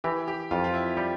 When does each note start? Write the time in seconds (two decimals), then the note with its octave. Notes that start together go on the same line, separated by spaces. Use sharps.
0.04 E3 G4
0.28 G4
0.51 F2 F4
0.64 F4
0.74 E4
0.97 G3 G4